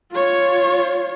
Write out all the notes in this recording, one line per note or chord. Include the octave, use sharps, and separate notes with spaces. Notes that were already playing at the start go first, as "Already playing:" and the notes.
F4 C#5